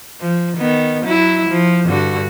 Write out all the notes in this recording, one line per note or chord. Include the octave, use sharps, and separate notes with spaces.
F3
D#3 B3
F#3 E4
F3
G2 D3 F#4